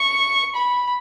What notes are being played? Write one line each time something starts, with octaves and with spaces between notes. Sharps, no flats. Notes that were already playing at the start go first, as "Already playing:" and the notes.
Already playing: C#6
B5